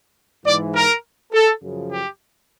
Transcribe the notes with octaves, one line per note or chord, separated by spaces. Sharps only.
G#2 E3 D5
A#4
A4
F#2 C#3 F3
G4